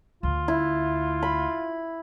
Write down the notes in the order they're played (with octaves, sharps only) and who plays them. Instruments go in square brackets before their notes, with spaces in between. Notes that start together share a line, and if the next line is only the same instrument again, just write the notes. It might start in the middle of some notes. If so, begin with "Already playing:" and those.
[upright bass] D2 D3 [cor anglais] F4
[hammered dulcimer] E4
B5